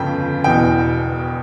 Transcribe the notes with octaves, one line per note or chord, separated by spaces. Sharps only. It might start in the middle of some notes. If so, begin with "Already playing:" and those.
Already playing: G1 F2 C#3 G5
E1 E2 B2 G5